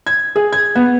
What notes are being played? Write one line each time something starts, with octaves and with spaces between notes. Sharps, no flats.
G#6
G#4
G#6
B3